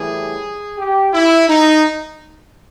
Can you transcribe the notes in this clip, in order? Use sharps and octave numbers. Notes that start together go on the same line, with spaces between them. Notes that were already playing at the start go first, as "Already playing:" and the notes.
Already playing: A2 E3 G3 G#4
G4
E4
D#4